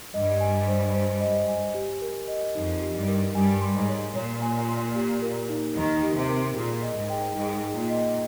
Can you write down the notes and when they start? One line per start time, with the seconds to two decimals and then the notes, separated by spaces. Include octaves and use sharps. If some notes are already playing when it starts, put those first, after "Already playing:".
0.14 G2 G3 D#5
0.41 G#5
0.68 C5
0.95 C5
1.21 D#5
1.48 G#5
1.74 G4
2.01 A#4
2.28 D#5
2.55 F2 F3 D#4
2.81 G4
2.95 G2 G3
3.08 A#4
3.35 G2 G3 G#5
3.61 C6
3.75 G#2
3.88 C#5
4.15 A#2 C#5
4.42 G#5
4.68 C6
4.95 G4
5.22 A#4
5.49 D#4
5.76 D#2 D#3 D#4
6.02 G4
6.16 C3
6.29 A#4
6.56 A#2 G#4
6.82 D#5
6.96 G#2
7.10 G5
7.35 G#2 D#4
7.63 G#4
7.76 A#2
7.90 D#5